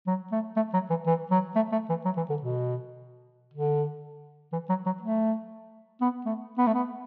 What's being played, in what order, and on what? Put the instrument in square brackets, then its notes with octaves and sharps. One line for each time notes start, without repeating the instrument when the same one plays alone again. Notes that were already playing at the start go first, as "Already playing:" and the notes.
[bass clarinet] F#3
A3
A3
F#3
E3
E3
F#3
A3
A3
E3
F#3
E3
D3
B2
D3
E3
F#3
F#3
A3
B3
A3
B3
A3
B3